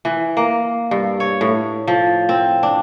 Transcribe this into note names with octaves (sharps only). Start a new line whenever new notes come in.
E3
A#3
G2
C#5
A2
F3
C4
D4